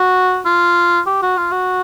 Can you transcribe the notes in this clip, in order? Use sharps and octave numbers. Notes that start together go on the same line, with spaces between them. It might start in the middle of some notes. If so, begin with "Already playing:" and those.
Already playing: F#4
F4
G4
F#4
F4
F#4